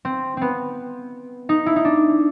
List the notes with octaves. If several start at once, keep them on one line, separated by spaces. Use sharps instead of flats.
C4
B3 C4
D#4
E4
D#4
D4